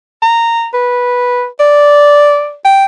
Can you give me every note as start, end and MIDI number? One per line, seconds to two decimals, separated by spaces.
0.22 0.68 82
0.74 1.46 71
1.60 2.56 74
2.65 2.86 79